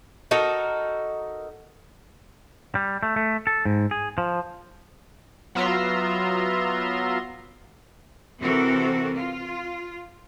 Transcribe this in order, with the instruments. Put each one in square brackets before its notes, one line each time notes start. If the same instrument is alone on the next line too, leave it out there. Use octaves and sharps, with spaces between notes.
[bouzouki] D#4 F#4 A4 A#4
[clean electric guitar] G3
A3
A3
A4
G#2
G#4
F3
[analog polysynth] F#3 B3 F4 E5 A#5 C6
[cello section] C3 E3 C4 F#4 A4 A#4
F4